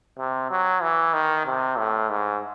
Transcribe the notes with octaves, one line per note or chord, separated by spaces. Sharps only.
C3
F#3
E3
D#3
C3
A2
G#2